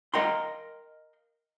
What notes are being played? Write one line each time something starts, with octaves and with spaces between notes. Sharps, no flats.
A#4 D#5 F5 G5 A#5 C6